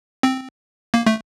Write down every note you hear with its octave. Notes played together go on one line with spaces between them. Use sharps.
C4
A#3
A3